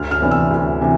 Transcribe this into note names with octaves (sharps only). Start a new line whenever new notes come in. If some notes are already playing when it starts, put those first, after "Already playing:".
Already playing: D2 F6
F6
C3 E3 B3 D4
E6
D2
C3 E3